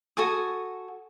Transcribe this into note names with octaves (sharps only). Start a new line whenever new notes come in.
F#4 A4 G#5 D#6